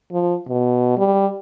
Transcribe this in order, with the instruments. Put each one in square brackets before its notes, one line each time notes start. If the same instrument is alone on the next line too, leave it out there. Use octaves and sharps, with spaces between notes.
[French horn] F3
B2
G3